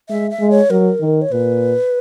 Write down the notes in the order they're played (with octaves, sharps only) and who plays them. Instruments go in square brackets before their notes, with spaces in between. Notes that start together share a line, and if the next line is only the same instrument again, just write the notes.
[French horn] G#3 [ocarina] E5
[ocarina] E5
[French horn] G#3
[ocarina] C#5
[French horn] F#3 [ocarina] A#4
[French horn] D#3
[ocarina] C#5
[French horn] A#2 [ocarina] B4